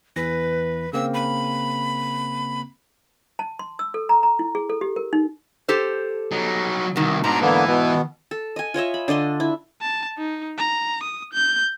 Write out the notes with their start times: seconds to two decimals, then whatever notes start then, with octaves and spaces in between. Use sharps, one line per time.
0.16 E2 E3 B4 A#6
0.93 C#3 A#3 C4 E6
1.14 B5
3.39 A5
3.59 C6
3.79 E6
3.94 A4
4.09 A#5
4.23 A#5
4.39 E4
4.55 G#4
4.70 A4
4.81 G4
4.96 A#4
5.13 D#4
5.68 G4 A4 C5
6.32 F#3 D#4
6.96 C2 B2 D#3
7.24 G#2 B2 D4 A#5
7.41 D3 E3 A#3 B3
7.67 B2 B3
8.31 A4
8.56 D#5 G#5
8.74 F4 C#5 D#5 E5
8.94 B5
9.08 D3 D4 D#5 C6
9.40 E4
9.82 A5
10.18 D#4
10.58 A#5
11.03 D#6
11.33 G6